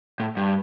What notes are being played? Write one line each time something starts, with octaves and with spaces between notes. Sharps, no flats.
A2
G2